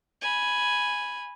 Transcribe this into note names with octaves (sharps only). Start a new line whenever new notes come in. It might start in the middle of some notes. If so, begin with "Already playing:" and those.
G#5 B5